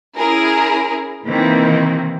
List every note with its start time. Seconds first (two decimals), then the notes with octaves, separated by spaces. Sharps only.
0.16 C#4 E4 G#4 A#4
1.27 C3 D#3 E3 A#3 C4